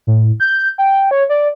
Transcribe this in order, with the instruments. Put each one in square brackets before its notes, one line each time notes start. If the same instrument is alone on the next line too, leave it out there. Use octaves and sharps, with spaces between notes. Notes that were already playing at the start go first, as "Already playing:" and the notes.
[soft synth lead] A2
G6
G5
C#5
D5